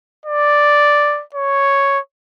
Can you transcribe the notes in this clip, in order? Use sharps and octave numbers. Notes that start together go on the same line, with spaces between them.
D5
C#5